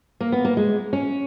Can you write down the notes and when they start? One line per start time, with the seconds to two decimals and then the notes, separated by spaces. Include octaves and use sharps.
0.20 A#3
0.32 B3
0.45 A#3
0.57 G#3
0.93 C#4